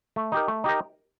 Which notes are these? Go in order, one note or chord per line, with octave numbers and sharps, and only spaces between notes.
A3
D#4 G4 A#4
A3
D#4 G4 A#4